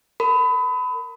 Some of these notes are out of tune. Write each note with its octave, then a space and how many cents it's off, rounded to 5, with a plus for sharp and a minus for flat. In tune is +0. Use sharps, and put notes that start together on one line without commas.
A#4 -20 B5 +25